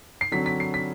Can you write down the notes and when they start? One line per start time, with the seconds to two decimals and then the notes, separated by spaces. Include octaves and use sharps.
0.21 C7
0.32 D3 F#3 C4 B6
0.46 B6
0.60 C7
0.74 B6